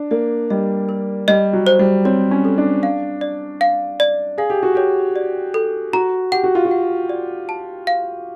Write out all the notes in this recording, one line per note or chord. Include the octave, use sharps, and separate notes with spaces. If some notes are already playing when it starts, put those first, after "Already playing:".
Already playing: D4
A#3 D5
G3 D#5
A#4
G3 D#5
F#3
C5
G3
C4 C#5
C#4
A4
D4
F5
D5
F5
D5
G#4 F5
G4
F#4
G4 C#5
D5
A4
F#4 A#5
G4 F#5
F#4
F4
F#4
F#5
D5
A5
F5